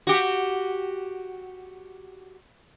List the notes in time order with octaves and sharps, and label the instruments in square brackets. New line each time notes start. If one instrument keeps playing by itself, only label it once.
[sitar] F#4 G4